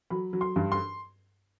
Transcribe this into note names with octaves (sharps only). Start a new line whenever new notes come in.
F#3 B5
F#3
C6
G2
C6